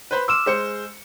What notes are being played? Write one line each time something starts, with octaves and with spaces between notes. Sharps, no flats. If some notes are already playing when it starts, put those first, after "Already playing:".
B4 C5 B5
C6 D6 E6 F6 E7
G#3 C5 C#7